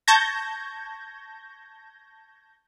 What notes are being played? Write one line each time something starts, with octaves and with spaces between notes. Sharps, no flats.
A5 C#6 G6 G#6 A#6